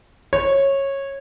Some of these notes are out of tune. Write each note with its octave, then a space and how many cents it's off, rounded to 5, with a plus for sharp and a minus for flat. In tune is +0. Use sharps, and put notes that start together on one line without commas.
C#5 -15